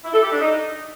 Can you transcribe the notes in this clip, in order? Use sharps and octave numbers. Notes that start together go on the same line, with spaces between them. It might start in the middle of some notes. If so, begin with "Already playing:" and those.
E4
A4
G4
D4
D#4